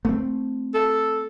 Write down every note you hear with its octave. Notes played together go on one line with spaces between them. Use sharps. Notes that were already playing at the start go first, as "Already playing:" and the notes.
A3 C4
A4